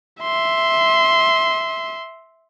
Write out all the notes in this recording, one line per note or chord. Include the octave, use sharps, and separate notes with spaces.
E5 C6